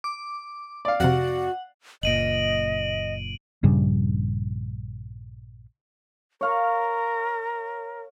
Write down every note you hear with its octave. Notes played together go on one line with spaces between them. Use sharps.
D6
D5 F5
F2 C3 F#4 F#5
F#1 A#2 D#5 D7 D#7 F#7
A#1 G2 C#3 G3
A#4 C#5 F5 C#6